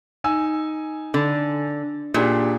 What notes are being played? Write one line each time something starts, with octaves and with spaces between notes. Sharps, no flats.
D#4 G#5 E6
D3
A#2 D4 G4 G#4